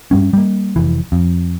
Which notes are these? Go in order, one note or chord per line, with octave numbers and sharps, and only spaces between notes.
G2 G3 C#4
G3 A#3
F1 E3
F2